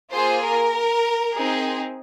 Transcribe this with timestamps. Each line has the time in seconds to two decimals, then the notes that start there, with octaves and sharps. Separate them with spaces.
0.12 A#3 F4 G#4 C5
0.43 A#4
1.35 C4 D#4 G#4